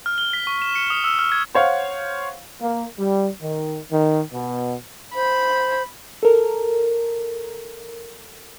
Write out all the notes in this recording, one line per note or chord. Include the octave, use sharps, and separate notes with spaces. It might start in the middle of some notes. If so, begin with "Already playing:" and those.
F6
G7
B6
C#6
E7
C#7
D#6
E6
F6
G#6
C5 C#5 F5 F#5
A#3
G3
D#3
D#3
B2
C5 B5
A4 A#4